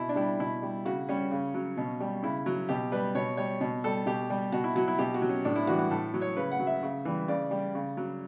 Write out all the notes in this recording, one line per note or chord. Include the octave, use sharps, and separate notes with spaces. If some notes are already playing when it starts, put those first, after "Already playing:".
Already playing: B2 E4
D4
G3 E4
B2 E4
G3
C#3 F#4
G3 C#4
C#3
F#3
B2
G3
C#3 E4
F#3
B2 G4
G3 B4
B2 C#5
G3 C#5
B2
G3 A4
B2 G4
G3
B2 F#4
E4
F#3 F#4
E4
B2 G4
F#4
F#3
C#4
A2 D4
E4
E3 G3 F#4
F#4
A2 A4
F#3
C#5
C#3 B4
F#5
F#3
E5
C#3
E3 G3
C#3 D5
G3
C#3
F#3